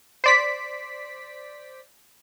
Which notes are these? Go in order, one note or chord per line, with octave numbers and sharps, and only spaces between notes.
C5 D5 B6